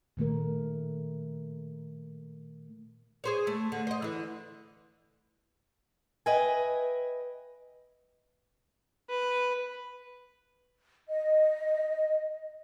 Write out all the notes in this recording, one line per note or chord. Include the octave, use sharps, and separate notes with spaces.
A#2 D#3 A3 A#4
G#4 C5 C#5
A3
D3
C5 D#5
D3 E3
B4 D#5 E5 G5 G#5
B4
D#5